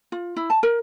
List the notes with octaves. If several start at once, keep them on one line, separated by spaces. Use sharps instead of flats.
F4
E4
A5
A#4